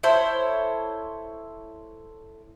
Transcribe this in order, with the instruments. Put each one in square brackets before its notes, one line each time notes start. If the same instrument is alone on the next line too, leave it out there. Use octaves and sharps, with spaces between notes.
[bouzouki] E4 A4 C5 C#5